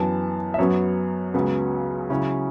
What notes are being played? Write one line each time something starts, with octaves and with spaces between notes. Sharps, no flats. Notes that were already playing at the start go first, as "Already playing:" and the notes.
Already playing: F#2 E3 B3 A5
E5
F#2 F#3 B3 C#5
C#2 C#3 F#3 B3
C#3 F#3 C#4 E4